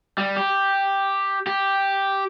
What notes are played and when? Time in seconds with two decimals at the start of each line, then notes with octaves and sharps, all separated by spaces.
0.18 G3
0.36 G4
1.47 G4